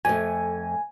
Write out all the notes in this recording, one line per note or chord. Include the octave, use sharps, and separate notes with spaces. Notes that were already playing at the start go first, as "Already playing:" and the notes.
F2 A3 G#5